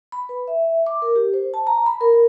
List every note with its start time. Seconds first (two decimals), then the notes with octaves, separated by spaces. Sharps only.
0.12 B5
0.29 B4
0.48 E5
0.87 D6
1.02 A#4
1.16 G4
1.34 C5
1.54 A5
1.67 A#5
1.86 B5
2.01 A#4